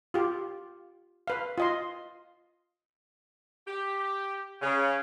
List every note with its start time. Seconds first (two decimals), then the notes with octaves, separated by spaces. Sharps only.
0.14 F4 G4
1.27 B4 F5
1.58 F4 D#5 C6
3.67 G4
4.62 C#3